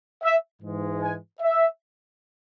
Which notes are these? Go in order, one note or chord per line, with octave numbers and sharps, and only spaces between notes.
E5
G#2 E3 G#3
G#5
E5